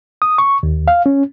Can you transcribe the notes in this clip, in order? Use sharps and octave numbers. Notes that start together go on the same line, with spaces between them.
D#6
C#6
D#2
F5
C#4